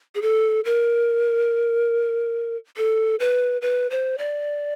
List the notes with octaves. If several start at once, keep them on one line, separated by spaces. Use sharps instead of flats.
G#4
A4
A#4
A4
B4
B4
C5
D5